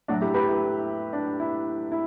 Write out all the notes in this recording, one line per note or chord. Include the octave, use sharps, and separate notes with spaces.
A2 F#3 D4 F#4
E4 G4
G4 B4
E4
D4
E4
E4